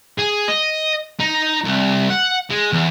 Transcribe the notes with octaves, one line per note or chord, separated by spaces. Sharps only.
G#4
D#5
D#4
C2
F#5
G#3
E2